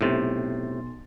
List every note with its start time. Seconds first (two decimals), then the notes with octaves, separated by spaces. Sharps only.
0.01 B1 A2 C3 C6 A6